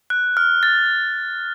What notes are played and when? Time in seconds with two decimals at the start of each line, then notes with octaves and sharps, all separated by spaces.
0.10 F#6
0.37 F6
0.63 A6